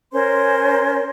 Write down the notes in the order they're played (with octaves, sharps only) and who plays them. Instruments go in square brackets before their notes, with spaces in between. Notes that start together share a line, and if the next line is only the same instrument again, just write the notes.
[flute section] C#4 A#4 C5 C6